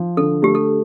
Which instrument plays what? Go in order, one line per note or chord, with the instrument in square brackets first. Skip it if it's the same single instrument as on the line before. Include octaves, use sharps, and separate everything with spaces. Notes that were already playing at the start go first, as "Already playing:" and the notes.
Already playing: [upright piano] F3
[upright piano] D3 [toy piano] A4
[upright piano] A3 [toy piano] G4
[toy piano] A4